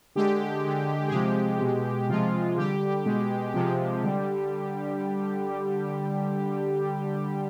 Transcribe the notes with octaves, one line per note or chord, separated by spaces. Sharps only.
D3 G#3 G4
D3 G#3
G#4
C3 F3 G#3 G4
B2 G#3
C3 F3 G#3 F4
D3 G3 G4
B2 G#3
C3 F3 G#3 G4
D3 G3